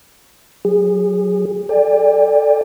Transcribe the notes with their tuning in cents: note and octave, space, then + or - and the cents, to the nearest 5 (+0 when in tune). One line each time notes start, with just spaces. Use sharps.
F#3 -5 G#4 -25
A4 +0 D5 +0 G5 +40